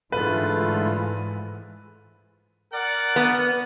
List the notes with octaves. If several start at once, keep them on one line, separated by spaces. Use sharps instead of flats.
G#2 D3 E3 G#3 A3 F4 B4
A#4 D5 F#5
B3